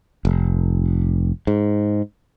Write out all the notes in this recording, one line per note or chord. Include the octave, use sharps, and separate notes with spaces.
F1
G#2